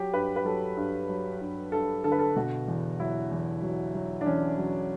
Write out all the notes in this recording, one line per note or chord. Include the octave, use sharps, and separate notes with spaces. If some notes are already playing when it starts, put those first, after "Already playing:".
Already playing: F#3 G4
G2 B4
B4
F#3 A4
G2
F#3
G2
G2 A4
D3 A4
B4
A4
B2 F#4
E2
F#3 E4
E2
F#3
F#3
D4
E2 C#4
F#3